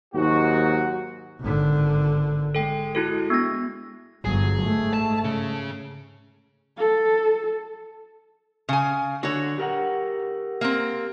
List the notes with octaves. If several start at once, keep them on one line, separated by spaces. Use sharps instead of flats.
D#2 G#2 F#3 F#4
G#1 D3
G#3 A4 G5
E4 F#4 A4
B3 D4 A#6
G1 F#3 G#4
G#2 A3
A5
C#3 C#4
A4
C#3 G#5
D3 D4 F#4 C#5
G4 A#4 F#5
A#3 C4